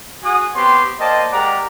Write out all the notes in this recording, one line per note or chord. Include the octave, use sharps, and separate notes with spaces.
F#4 G#4 F#5 G#5 D#6
B3 C4 G4 C#5 C6
A#3 C5 D5 D#5 G5 A5
G#3 G4 A#4 D5 F#5 A#5